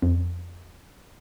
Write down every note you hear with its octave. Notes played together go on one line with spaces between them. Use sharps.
F2